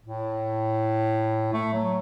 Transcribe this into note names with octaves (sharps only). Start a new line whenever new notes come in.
A2
A3
F#3